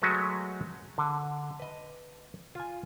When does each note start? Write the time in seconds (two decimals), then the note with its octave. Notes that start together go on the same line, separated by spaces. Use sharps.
0.02 F#3 G#3 A3 F#4 B4
0.98 D3
1.59 B4 D#5
2.55 F4 G#5